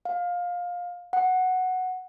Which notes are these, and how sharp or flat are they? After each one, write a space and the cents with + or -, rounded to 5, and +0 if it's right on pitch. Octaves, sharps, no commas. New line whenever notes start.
F5 +20
F#5 +0